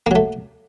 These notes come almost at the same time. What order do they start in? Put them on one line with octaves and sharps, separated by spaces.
A#3 F#3 A3